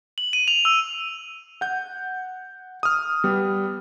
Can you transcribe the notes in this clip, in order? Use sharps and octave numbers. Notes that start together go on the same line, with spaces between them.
F#7
D#7
F7
E6
F#5 G6
D#6 F6
G3 B3